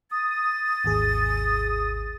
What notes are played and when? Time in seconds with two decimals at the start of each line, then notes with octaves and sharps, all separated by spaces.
0.11 D#6 A6
0.84 G#1 D#2 G#4